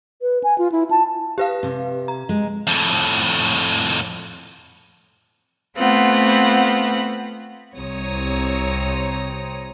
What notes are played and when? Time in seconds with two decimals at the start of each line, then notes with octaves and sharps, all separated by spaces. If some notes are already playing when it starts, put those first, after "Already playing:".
0.22 B4
0.44 G#5
0.58 F4
0.72 E4
0.91 A5
1.38 G4 B4 F5
1.63 C3
2.08 A#5
2.29 G#3
2.67 F2 A2
5.77 A3 B3 C4 F4 F#5
7.75 C2 C3 C4 C#5 A#5 D#6